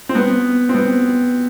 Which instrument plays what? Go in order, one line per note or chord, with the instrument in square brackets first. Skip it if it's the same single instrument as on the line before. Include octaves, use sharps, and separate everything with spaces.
[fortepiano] C4
B3
C4
B3